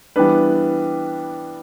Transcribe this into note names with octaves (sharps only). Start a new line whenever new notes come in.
E3 G3 B3 D4 B4